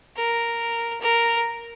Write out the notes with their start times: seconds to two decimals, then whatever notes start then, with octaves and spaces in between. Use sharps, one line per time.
0.16 A#4
1.00 A#4